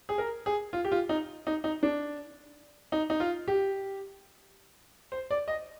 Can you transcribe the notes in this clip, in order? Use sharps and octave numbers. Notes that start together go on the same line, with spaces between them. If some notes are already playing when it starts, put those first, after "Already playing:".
G#4
A#4
G#4
F4
G4
F4
D#4
D#4
D#4
D4
D#4
D#4
F4
G4
C5
D5
D#5